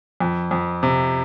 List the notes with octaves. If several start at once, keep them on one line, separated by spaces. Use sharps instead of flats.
F2
F2
C3